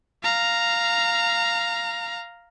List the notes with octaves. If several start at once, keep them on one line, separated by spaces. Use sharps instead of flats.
F5 A#5